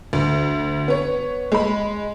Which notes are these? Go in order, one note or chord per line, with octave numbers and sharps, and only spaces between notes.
D2
B3 C#5
G#3 B5